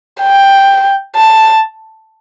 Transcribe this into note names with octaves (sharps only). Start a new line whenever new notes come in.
G5
A5